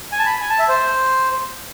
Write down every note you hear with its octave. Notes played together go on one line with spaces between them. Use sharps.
G#5
A5
B5
G#5
A5
E5
C5